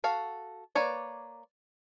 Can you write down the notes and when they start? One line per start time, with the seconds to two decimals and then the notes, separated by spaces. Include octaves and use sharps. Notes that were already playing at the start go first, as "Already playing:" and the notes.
0.04 F#4 A4 F5
0.75 A#3 B4 C#5 D5